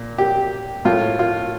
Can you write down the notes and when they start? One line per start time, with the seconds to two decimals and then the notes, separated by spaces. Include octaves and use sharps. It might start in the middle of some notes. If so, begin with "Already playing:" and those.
Already playing: A#2
0.18 G4
0.85 A2 F4
1.19 F4